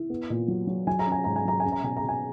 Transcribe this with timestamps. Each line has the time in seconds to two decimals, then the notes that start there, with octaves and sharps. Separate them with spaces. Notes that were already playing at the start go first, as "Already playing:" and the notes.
Already playing: E4
0.10 B3
0.30 A#2
0.48 F#3
0.67 F#3
0.87 F#3 G#5
0.99 A#5
1.06 C#4
1.12 G#5
1.24 G#2 A#5
1.36 G#5
1.45 F#3 A#5
1.60 C#4 G#5
1.72 A#5
1.83 B2 G#5
1.97 A#5
2.03 B2
2.09 G#5